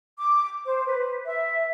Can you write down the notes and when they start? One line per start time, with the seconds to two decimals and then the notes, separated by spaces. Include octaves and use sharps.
0.18 D6
0.65 C5
0.86 B4
1.25 E5